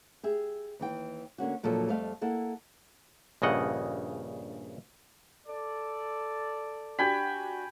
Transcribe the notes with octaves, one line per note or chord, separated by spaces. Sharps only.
G4 G#4 E5
D#2 E3 G5
D3 A#3 C#4 F#4
D2 A#2 F3 F#3 A4
F2 G3 A3 D#5 F5
A#3 E4 A4 F#5
A#1 G2 C#3 D#5 F#5
A4 D5
D4 F#4 G4 G5 G#5 B5